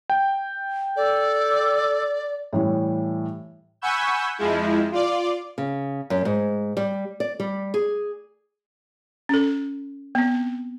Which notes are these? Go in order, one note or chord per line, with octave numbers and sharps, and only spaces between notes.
G5
A4 D5
A2 E3 G3
F#5 G#5 B5 C#6 E6 G6
F2 F3 G#3 E4
F4 D5
C#3
F#2
G#2
G3
D5
G3
G#4
C#4 A4
B3 C4